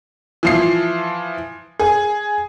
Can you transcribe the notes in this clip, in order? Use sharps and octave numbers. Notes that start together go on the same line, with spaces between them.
E3 F3 C7
G#4